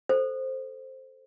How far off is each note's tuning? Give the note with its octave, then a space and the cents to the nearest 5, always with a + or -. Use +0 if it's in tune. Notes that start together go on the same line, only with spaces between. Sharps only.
A4 +0 C5 +0